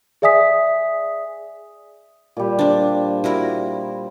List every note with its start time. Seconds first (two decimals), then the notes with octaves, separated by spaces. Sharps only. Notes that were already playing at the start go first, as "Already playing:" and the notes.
0.22 G#4 D5 E5 G#5 D#6 B6
2.37 A#2 G3
2.59 G3 D4 C5
3.24 E4 F#4 A#4